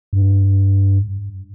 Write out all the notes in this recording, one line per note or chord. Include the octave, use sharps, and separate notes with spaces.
G2